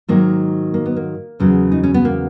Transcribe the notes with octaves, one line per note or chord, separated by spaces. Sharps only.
G#2 D#3 F#3 A#3
A#3
B3
A#3
E2 C#3 F#3
D#4
C#4
B3
A#3